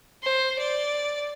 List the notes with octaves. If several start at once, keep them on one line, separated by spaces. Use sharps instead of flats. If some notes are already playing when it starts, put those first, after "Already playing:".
C5
D5